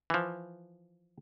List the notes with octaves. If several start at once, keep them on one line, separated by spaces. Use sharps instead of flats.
E3 F3